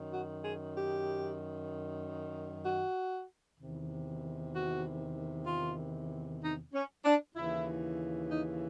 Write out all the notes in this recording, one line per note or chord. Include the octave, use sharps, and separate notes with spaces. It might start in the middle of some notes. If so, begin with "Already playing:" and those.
Already playing: F#2 D#3
F#4
G#4
G4
F#4
E2 C3 D#3
F#4
F4
D#4
C#4
D4
D#2 C#3 E3 E4
D#4